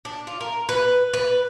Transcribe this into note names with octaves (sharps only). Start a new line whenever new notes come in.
D4
F4
A#4
B4
B4